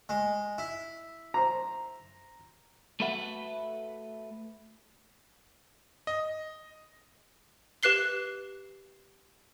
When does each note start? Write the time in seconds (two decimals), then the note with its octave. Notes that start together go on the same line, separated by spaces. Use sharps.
0.09 G#3
0.58 E4
1.34 C5 A#5
3.00 A3 F#4 A4 B4 E5 F#5
6.07 D#5
7.83 G4 B4 F#6 C7 G7